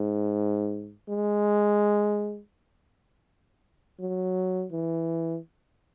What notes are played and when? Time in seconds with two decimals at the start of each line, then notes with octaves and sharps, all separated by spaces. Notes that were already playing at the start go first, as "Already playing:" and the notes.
Already playing: G#2
1.09 G#3
4.00 F#3
4.72 E3